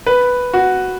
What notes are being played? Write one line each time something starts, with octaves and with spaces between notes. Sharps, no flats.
B4
F#4